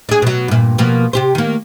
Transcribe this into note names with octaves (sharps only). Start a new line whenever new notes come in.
D4 G#4
B2 F#3
G2 A#2
B2 F3 A#3
C3 G4 C5
D#3 A#3